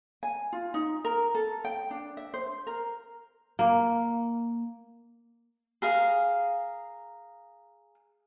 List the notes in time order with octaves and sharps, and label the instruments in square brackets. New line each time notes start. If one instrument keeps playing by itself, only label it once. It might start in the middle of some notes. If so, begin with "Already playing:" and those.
[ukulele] G#5
F4
D#4
A#4
A4
G5
D4
E5
C5
A#4
[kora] A#3
[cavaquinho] G#4 A#4 F5